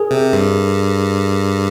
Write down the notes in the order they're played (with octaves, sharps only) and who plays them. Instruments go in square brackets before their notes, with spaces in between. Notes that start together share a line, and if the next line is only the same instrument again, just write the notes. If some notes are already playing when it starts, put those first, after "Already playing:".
Already playing: [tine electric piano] G#4 A#4
[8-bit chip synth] C3
G2